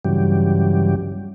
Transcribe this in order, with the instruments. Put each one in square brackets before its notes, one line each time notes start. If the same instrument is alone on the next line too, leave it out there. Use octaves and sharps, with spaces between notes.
[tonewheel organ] G2 C#3 E3 F#3 G3 G4